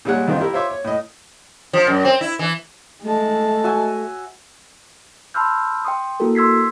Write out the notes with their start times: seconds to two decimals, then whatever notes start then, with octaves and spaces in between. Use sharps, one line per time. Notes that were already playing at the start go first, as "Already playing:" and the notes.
0.05 A#2 G3 G#3 C#5 F#5 F#6
0.28 F2 D#3 C4 F4
0.41 E4 G4 A#4
0.54 F4 C5 C#5 E5 C6 D6
0.70 C#5
0.85 A2 D#5
1.73 F3
1.87 F#2
2.05 C4
2.21 E4
2.39 E3
3.03 G#3 A3 A5
3.64 F#4 E5 G#5
5.34 A5 B5 C6 E6 F6 G6
5.85 G5 C6 D#6
6.20 A#3 E4 F#4 A4 A#4
6.35 C6 E6 G#6 B6 C7